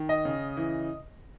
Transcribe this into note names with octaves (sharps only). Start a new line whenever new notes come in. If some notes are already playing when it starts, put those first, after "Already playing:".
Already playing: D#3
D#5
C#3
E3